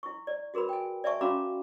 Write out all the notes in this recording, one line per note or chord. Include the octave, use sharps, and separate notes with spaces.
E4 C#6
D5
F#4 G#4 A#4 B4 B5
G5 G#5
D5 E5 G#5 A5 C#6
C#4 F#4 F5 A#5 B5 D6